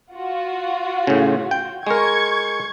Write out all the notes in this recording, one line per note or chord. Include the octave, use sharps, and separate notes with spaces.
F4 F#4
A2 C#3
G5
G#3 A#4 C#6 G#6